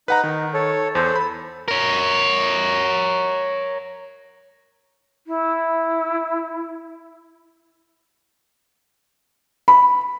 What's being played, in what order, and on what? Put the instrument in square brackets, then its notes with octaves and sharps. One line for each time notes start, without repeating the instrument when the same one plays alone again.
[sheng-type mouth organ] D#4 [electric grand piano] B4 F#5 A#5
[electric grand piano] D#3
[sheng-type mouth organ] A4 C#5
[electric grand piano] E2 [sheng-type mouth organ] A4 C5
[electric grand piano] B5
[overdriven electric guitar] A#4 C#5
[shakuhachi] E4
[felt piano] B5